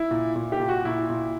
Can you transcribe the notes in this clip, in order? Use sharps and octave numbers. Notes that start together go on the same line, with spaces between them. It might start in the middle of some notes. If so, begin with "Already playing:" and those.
Already playing: E4
A#2
A#2
G4
A#2
F#4
A#2 E4
A#2